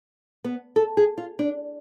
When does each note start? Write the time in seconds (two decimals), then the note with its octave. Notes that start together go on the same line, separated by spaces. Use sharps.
0.44 B3
0.76 A4
0.97 G#4
1.18 F4
1.39 D4